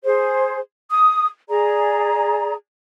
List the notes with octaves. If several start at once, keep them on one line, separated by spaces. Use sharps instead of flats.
G#4 C5
D#6
G#4 D5 A#5